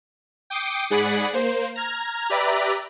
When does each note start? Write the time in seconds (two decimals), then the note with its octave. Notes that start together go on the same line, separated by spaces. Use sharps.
0.50 G5 D6 D#6 C7 C#7
0.90 G#2 G#4 D5 F#5 B5
1.33 A#3 C5
1.76 A#5 F6 G#6
2.30 G4 B4 D5 E5 A#5 B5